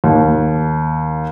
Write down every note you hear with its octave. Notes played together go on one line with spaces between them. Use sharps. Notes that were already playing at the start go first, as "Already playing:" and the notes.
D#2